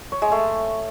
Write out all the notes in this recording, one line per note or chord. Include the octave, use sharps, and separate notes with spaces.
C#5
G#3
A3